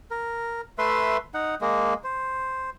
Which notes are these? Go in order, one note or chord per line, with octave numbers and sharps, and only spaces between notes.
A#4
A3 B4 E5 C6
D#4 F#5
G#3 A#3
C5